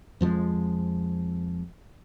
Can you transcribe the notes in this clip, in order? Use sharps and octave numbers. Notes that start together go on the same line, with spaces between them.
F2 F3 F#3 G#3